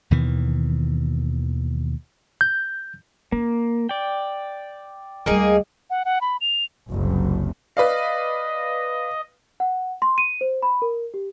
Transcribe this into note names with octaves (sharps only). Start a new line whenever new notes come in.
D#2 B2 D#3 E3
G6
A#3 C#4
D5 G5
D2 G3 A#3 D#4 G#4
F#5
F#5
B5
F7
F#1 C2 F#2
B4 D5 D#5 F5
F#5
C6
D#7
C5
B5
A#4
G4